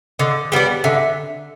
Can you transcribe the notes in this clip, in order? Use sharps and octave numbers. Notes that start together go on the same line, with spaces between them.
D3 D#5
G3 B3 D4
D3 E5